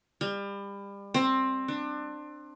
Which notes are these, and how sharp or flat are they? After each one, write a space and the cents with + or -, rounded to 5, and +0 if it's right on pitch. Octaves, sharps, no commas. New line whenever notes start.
G3 +30
C4 +15
D4 +25